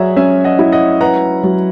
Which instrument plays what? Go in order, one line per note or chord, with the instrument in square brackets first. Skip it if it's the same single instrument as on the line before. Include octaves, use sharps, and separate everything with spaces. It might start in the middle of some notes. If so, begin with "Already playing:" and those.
Already playing: [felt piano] F#3 [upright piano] G#4 C#5 E5 F#5 A#5
[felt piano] C#4 [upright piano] E5 G#5
[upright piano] D#5 F#5
[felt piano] E4
[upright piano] D#5 F#5
[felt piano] B4 [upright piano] F#5 A#5
[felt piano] F#3